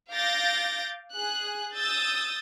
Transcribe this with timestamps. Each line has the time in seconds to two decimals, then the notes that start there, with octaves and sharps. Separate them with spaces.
0.12 F5 D6 G6 A6 A#6
1.15 G#4 F#6
1.74 D#6 E6 G6 A6